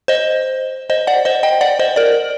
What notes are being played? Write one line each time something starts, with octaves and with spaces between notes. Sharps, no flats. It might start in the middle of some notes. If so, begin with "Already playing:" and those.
C5 D#5
C5 D#5
D5 F#5
C5 D#5
D#5 G5
D5 F#5
C5 D#5
A#4 D5